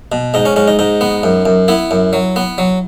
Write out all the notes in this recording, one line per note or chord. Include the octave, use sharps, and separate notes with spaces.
B2
G#2 D#4
C#4
G#2 C#4
D#4
G#2 D#4
B3
F#2
F#2
B3 E4
F#2
F#3
B3
F#3